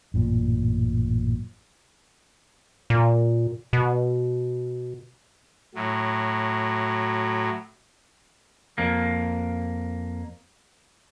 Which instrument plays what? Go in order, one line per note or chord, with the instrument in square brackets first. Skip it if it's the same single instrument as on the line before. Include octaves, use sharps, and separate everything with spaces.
[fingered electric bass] A1 F#2 A#2
[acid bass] A#2
B2
[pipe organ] A2 F#3
[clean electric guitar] F2 A#3